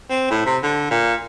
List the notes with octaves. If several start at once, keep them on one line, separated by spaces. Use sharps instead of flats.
C4
A2
C3
D3
A#2